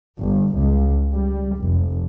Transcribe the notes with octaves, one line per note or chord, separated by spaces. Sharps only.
G1
C#2
G3
F1